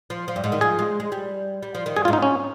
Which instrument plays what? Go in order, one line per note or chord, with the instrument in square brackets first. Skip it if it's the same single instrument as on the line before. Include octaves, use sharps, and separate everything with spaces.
[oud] F3
F3
G2
G#2
D#3
[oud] F3 [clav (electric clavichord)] G#4
[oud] G#3
G#3
G3
G3
F3
D#3
[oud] G2 [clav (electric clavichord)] G#4
[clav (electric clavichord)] F4
[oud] G#2
[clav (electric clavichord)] D#4
C#4